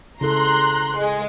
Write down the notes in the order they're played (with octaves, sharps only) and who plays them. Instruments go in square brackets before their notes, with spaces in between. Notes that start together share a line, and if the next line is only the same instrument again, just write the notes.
[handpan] C#3 E4 A4 [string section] A#5 C6 F#6
[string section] G#3